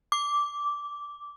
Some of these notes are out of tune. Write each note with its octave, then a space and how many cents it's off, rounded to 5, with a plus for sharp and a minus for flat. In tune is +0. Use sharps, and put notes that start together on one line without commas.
D6 -10